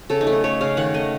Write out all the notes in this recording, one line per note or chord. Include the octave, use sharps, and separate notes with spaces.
C#3 A4
D#4
A3
D#4
A3 C#5
C#3 F5
D#3 F#5
A3 D#5